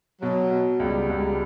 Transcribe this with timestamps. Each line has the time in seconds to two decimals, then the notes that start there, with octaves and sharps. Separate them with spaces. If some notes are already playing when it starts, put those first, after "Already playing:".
0.22 B2 F#3
0.51 B2
0.80 C#2 G3
1.10 C#2